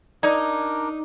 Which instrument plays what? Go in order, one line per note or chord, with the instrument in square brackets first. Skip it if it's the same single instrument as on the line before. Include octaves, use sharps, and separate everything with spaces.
[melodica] D4 A#4 [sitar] D#4 [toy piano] D5